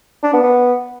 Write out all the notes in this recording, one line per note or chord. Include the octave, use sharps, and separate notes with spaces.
D4
B3
B3